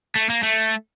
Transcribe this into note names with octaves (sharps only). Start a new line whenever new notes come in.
A3
A#3
A3